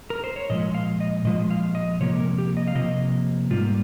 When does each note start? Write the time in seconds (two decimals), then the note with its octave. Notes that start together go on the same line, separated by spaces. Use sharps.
0.10 A#4
0.24 C5
0.36 C#5
0.50 A#2 F3 G#3 D#5
0.75 F5
1.00 D#5
1.25 A#2 F3 G#3 D#5
1.51 F5
1.75 D#5
2.01 C3 F3 A#3 C#5
2.19 A#4
2.38 G4
2.57 D#5
2.68 F5
2.75 C3 F3 A#3 D#5
3.50 G#2 G3 A#3 F4